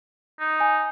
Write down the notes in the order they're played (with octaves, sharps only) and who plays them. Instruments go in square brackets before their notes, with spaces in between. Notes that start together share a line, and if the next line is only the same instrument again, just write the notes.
[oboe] D#4
[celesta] G#5